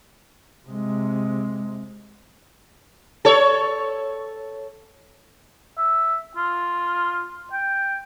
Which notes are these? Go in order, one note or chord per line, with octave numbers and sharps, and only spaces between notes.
C3 G#3
A4 C#5
E5
F4
G5